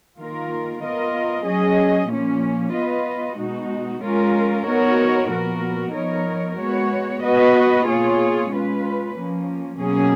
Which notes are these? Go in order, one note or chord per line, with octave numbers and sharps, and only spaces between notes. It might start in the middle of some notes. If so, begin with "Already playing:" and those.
D#3 A#3 F4 A#4
B3 F4 A#4 D#5
F#3 C#4 G#4 D#5
A#2 F3 A#3 C#4
B3 F4 B4 D#5
B2 G#3 D#4 F#4
G#3 C#4 F4 A#4
B3 D#4 F#4 A#4 C#5
A#2 F3 B3 F#4 A#4
F3 B3 D#4 A#4 C#5
G#3 B3 F#4 C#5
B3 F#4 B4 D#5
B2 A#3 F4 G#4 C#5
G#3 C#4 F4 B4
F3 A#3 C#4
B2 F#3 A#3 C#4 G#4